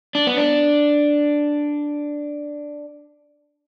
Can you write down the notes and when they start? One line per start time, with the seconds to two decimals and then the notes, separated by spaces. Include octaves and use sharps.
0.15 D4
0.27 B3
0.37 D4